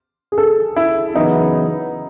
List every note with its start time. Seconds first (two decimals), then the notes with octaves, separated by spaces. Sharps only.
0.32 G#4
0.38 A4
0.76 E4
1.15 F#2 C#3 E3 B3 D#4 E4